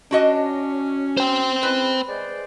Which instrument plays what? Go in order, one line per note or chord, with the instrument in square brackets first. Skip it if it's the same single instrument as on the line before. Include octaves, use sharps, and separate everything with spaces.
[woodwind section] C#4 [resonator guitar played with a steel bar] D4 F#4 D#5
[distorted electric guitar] C5 G5
[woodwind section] G#3 C#4 E4 [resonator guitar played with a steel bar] B4
[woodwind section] G#3 C5 D5